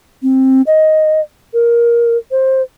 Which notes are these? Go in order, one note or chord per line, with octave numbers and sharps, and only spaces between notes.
C4
D#5
A#4
C5